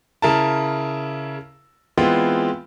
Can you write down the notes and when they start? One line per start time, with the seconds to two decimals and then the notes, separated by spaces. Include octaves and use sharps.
0.22 C#3 E4 A#4 A5
1.97 E3 G#3 B3 C4 F4